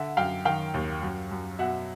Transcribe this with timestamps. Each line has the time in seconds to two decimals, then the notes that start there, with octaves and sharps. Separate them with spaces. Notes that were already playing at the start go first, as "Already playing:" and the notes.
Already playing: D3 E5 F#5
0.17 F#2 F5 G5
0.45 D#3 F5 G5
0.74 D#2
1.02 F#2
1.31 F#2
1.59 B2 E5 F#5